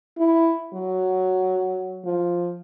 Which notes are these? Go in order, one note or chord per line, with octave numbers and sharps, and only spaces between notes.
E4
F#3
F3